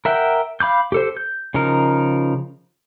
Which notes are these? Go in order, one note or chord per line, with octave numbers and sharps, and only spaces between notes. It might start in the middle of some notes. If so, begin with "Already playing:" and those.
A#4 E5 F#5 G5
F5 B5 D6 G6
G4 A4 C5
G6
C#3 F3 D#4 A#4